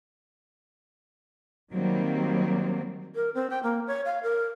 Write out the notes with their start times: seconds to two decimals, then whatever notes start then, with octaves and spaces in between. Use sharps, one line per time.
1.73 D#3 F#3 G3 A#3 C4
3.15 A#4
3.35 C4
3.50 G5
3.63 A#3
3.87 C#5
4.05 F5
4.23 A#4